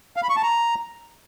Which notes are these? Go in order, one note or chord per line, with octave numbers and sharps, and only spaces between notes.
F5
B5
C#6
A5
A#5